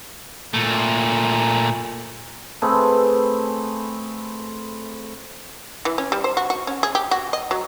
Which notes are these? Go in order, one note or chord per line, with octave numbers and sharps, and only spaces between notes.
A#2 A3
A3 C4 G#4 B4
E3
C#4
G3
C5
F#4
F#4
C#4
G#4
G4
F#4
D#5
F#3